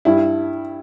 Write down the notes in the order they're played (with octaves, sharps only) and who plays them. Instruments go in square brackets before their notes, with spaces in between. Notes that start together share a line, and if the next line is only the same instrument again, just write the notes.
[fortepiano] G2 E4